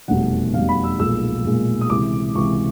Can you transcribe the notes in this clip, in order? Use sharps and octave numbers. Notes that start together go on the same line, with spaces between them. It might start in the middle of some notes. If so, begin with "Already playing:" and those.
F1 E2 B2 G3 F#5
F1 E2 B2 G3 F5
B5
E6
B1 A#2 F3 G#3 E6
B1 A#2 F3 G#3
D#6
C#2 C3 E3 D6
C#2 C3 E3 C#6